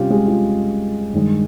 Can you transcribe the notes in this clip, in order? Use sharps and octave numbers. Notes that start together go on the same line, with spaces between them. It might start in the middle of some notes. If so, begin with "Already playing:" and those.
Already playing: C3 G3 C#4 F4 G4
G#3 G#4
F4
G2 D#3 G#3